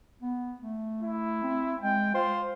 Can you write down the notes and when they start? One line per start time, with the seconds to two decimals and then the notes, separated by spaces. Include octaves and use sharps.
0.22 B3
0.62 A3
1.03 E4
1.43 C4
1.82 G#3 G5
2.14 F4 C5